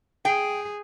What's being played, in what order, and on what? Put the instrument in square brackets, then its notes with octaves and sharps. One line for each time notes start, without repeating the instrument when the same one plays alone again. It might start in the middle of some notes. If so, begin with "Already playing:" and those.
[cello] G#4 [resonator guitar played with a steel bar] G5